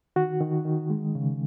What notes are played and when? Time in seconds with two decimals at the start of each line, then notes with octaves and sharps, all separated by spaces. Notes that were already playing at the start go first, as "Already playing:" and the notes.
0.16 D#3 F#4
0.41 D#3
0.65 D#3
0.90 G#3
1.15 C#3